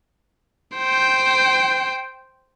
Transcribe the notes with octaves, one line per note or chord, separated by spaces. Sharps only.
C5 G5